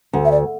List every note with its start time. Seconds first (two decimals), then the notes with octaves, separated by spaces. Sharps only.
0.13 D2
0.25 E5
0.32 D5